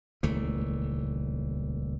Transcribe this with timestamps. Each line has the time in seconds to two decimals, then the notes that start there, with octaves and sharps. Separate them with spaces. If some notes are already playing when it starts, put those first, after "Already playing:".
0.23 D#1 C#2 E3 A3